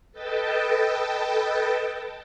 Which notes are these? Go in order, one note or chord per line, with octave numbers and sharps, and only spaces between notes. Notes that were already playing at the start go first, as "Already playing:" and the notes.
A4 B4 D#5 G5 A5